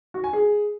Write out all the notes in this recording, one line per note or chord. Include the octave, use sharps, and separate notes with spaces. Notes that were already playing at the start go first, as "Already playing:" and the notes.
F#4
G#5
G#4